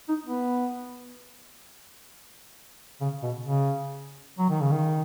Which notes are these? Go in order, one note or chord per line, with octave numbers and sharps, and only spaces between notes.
D#4
B3
C#3
B2
C#3
F#3
D#3
C#3
D#3